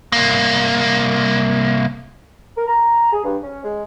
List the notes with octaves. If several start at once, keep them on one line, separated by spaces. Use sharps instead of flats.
C2 A#3
A#4
A#5
G#4
G2
C#4
G#3